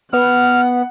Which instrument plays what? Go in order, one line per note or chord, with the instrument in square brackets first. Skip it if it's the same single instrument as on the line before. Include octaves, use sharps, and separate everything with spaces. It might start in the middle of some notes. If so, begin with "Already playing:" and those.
[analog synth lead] B3 [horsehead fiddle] F#5 [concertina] F6